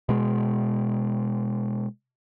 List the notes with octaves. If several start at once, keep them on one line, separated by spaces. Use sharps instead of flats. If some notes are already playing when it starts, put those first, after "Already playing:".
B2 G#3